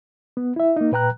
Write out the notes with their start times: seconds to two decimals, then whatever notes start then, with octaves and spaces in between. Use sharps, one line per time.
0.37 B3
0.56 E4 E5
0.76 A#3 D#4
0.92 A#2 B4 G5 A#5 F#6